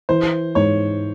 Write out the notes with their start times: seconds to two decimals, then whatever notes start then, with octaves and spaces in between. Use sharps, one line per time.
0.09 E3 C5
0.55 G#2 C#5